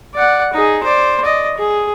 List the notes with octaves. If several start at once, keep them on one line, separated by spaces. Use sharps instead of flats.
D5 F#5
D#4 G#4
C5 D5
D5 D#5
G#4